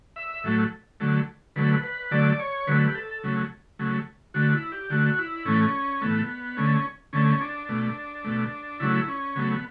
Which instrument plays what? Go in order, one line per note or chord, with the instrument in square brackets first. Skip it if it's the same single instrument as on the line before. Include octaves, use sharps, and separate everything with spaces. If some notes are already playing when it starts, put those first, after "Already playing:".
[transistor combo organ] E5
A2 F#3 A3
D3 F#3 A3
D3 F#3 A3 B4
B4
D3 F#3 A3 D5
D5
C#5
D3 F#3 A3 B4
G4
A4
C#3 F#3 A3
C#3 F#3 A3
D3 A3 F#4
E4
G4
D3 A3 F#4
E4
A2 E3 A3 C#4
A2 E3 A3 B3
D3 A3 C#4
D3 A3 C#4
D4
B2 A3
B2 A3
C#3 F#3 A3 E4
C#4
C#3 F#3 A3 B3